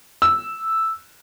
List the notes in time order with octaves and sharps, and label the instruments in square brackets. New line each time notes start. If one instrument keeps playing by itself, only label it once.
[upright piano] E6